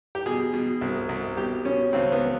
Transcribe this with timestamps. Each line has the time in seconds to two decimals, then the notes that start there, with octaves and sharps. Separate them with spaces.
0.15 G4
0.26 B2 G#4
0.54 B2
0.81 C2
1.09 C2
1.37 B2 G4
1.65 B2 C#4
1.93 C#2 C4
2.12 B3